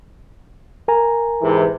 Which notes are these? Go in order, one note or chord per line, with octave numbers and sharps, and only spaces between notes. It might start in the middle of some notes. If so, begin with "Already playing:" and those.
A#4 G#5 A#5
G#2 C3 E3